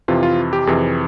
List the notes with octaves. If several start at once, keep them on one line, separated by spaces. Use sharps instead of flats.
F2 C3 E3 F4
F4
G4
F2 C3 E3 G#4